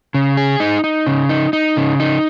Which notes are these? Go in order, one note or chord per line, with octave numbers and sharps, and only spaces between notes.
C#3
G#4
D#4
D#4
C#3
D#4
D#4
C#3
D#4